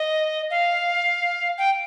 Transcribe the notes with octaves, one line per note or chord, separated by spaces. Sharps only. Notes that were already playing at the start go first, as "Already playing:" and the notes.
Already playing: D#5
F5
G5